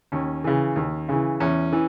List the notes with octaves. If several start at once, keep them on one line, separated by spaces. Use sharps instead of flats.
D#2 C#4
C#3 E3
D#2
C#3 E3
E2 C#4
E3